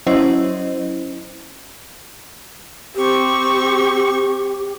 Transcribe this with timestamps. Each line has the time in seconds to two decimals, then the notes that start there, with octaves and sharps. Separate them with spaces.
0.07 F#3 C#4 E4 C5 D#5
2.95 C4 G4 C#6